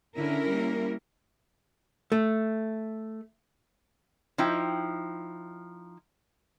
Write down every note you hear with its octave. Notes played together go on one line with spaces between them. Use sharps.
D3 C#4 E4 A#4
G3 A#3
A3
F3 D#4 E4 G5